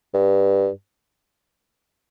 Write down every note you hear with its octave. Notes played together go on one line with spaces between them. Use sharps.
G2